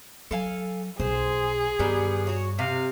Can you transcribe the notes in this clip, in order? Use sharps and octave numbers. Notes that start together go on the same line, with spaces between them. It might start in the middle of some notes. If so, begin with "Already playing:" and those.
F#3 A4 F5 G#5
B1 G#4 C5
G2 D#3 G3 B3
F#4 C#5
C3 F5